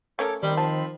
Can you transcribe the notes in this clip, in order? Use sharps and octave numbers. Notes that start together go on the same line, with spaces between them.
A3 C#4 A4 A#4 C#5 D6
D#3 G3 C4 B5 C6
F3 A5